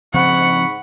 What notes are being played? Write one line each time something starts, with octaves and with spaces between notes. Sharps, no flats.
G#2 C#3 F3 C4 F#5 B5 C#6